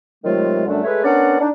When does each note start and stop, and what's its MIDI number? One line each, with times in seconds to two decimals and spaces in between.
0.25 0.66 48
0.25 0.66 51
0.25 0.66 54
0.25 0.66 56
0.25 0.66 57
0.25 0.66 65
0.66 0.81 42
0.66 0.81 50
0.66 0.81 55
0.66 0.81 57
0.66 0.81 62
0.84 1.00 56
0.84 1.00 57
0.84 1.00 68
0.84 1.00 71
0.84 1.00 73
0.84 1.00 76
1.04 1.38 59
1.04 1.38 61
1.04 1.38 62
1.04 1.38 70
1.04 1.38 74
1.04 1.38 78
1.40 1.48 62
1.40 1.48 63